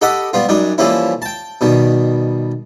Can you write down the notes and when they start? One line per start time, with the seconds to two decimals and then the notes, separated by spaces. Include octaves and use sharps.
0.02 G4 A4 D#5 F#5 B5 D#6
0.33 G3 B3 F4
0.49 F#2 G3 D4 D#4
0.78 E3 F3 G3 A#3 C#4 E4
1.22 G5 A5
1.61 B2 D#3 G3